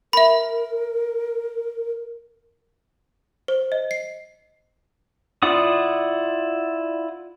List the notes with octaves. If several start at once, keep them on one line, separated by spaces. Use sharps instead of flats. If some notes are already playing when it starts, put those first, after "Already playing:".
A#4 E5 B5
C5
D#5
C7
E4 F4 D5 F#5 D#6